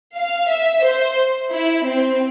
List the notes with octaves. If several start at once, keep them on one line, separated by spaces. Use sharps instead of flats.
F5
E5
C5
E4
C4